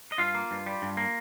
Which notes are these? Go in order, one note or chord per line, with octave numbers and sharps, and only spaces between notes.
D#5
G2 F4 F5
A#3
G2
G3
G2
A#3